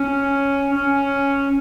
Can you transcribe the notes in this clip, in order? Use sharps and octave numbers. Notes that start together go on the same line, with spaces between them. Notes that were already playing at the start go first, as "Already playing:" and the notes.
Already playing: C#4
C#4